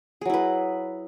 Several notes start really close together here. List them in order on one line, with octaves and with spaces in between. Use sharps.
G#4 F#3 E4 B4